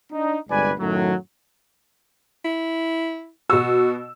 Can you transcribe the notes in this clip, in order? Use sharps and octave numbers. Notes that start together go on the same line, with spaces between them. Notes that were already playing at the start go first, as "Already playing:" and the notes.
D4 D#4
G1 C2 G#3 B4 D5 G#5
F#2 A2 D#3 F#3
E4
B2 F#4 E6